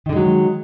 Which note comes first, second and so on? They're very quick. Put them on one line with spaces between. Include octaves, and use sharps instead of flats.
D#3 D3 G#3 F#3